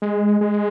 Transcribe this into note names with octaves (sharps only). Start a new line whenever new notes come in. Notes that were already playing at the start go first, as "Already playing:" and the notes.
G#3
G#3